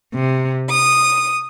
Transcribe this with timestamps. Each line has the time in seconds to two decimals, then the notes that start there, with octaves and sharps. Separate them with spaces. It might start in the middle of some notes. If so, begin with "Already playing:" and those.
0.13 C3
0.69 D#6